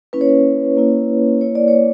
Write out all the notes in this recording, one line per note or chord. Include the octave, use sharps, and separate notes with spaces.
A#3 C#4 E4 B4
C#5
B4
A#3 C#4 E4
A#3 E4 C#5
D5
C#5